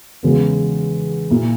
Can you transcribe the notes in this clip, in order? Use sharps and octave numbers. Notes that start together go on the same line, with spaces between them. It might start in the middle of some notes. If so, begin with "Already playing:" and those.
E2 C#3 G#3 B3
A#2 A#3 E4